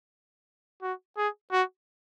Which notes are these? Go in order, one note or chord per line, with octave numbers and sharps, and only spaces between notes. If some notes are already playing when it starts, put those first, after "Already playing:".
F#4
G#4
F#4